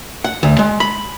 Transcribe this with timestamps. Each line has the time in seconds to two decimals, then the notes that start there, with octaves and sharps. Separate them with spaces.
0.24 F#5
0.43 D2
0.59 G#3
0.80 B5